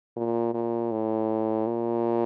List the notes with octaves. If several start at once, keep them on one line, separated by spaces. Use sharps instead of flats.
A#2
A#2
A2
A#2